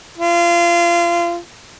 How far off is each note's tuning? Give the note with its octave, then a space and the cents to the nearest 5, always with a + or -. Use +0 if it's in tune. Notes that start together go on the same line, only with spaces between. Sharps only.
F4 -30